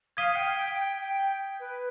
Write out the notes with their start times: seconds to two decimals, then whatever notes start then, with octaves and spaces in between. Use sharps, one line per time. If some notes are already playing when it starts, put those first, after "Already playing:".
0.17 F5 D#6 G#6 B6 D#7 G7
0.31 F5
0.36 G5
0.56 G5
0.75 G5
1.02 G5
1.60 B4